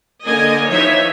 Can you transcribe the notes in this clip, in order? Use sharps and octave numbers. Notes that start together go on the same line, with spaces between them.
D3 A#3 A#4 D#5 G#5
E3 F3 D#4 C#5 E5